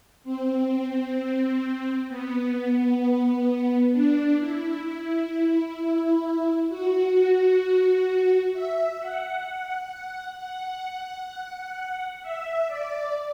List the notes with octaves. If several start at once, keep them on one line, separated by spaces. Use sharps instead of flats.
C4
B3
D4
E4
E4
F#4
E5
F#5
F#5
E5
D5